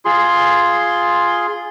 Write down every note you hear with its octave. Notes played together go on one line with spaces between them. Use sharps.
F4 G#4 C6